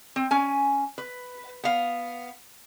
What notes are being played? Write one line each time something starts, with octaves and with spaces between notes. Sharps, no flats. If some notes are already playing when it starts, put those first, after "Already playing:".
C4
C#4 G#5
B4
B3 F5